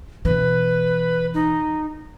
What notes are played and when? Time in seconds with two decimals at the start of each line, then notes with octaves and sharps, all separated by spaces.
0.25 B2 E3 B4
1.34 D#4